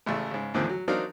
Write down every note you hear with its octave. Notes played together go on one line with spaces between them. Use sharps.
A1 C#3 A3
G#2 C#3
E2 A2 D3 D#3 F3 C4
F#3
F#3 C4 D4 D#4 A#4 F5